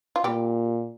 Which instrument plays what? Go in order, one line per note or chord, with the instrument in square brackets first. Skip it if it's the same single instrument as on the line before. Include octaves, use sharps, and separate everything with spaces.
[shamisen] F4
[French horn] A#2 [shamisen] G3 G4